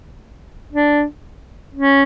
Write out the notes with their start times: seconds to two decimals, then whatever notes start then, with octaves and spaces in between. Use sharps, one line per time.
0.72 D4
1.74 C#4